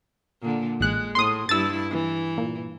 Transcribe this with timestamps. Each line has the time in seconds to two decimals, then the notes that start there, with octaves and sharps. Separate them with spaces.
0.42 A#2 D3
0.80 A1 G#3 F#6
1.15 A2 C6 D#6
1.49 G2 E4 E6 A6
1.91 E3
2.38 A#2